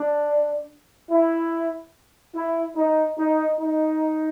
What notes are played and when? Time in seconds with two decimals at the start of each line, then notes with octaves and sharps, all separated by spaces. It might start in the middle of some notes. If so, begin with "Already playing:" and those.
Already playing: D4
1.10 E4
2.35 E4
2.76 D#4
3.18 D#4
3.60 D#4